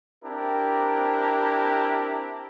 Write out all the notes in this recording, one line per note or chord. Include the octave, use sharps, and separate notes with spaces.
C4 D4 E4 G4 A#4